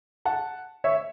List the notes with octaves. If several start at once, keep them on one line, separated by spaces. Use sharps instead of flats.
F#5 A5
C#5 E5